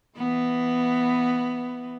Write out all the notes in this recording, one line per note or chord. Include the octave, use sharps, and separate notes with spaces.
E3 B3